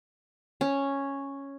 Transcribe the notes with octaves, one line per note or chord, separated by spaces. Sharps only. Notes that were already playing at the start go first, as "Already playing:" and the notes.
C#4